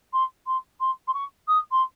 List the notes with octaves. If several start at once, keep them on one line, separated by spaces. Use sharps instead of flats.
C6
C6
C6
C6
C#6
D#6
C6